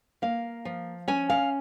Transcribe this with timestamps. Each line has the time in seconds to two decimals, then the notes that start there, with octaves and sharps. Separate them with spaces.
0.22 A#3 F5
0.65 F3
1.08 C#4 G#5
1.30 F5